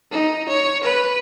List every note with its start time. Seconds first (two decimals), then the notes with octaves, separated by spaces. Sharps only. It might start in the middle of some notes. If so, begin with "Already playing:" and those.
0.11 D#4
0.49 C#5
0.83 B4